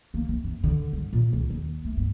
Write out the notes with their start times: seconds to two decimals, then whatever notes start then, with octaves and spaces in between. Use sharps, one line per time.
0.14 A#3
0.29 E3
0.44 F#2
0.63 D3
0.93 G2
1.13 A#2
1.33 C#2
1.50 D#2
1.85 A3
1.97 G2